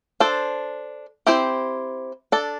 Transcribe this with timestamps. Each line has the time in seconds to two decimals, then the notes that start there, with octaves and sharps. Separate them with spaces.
0.20 D4 A4 C5
1.26 C4 E4 G4 C5
2.32 D4 A4 D5